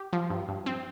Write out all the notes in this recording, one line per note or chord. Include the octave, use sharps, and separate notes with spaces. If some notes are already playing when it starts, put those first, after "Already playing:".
Already playing: G4
F3
G2
G2
C4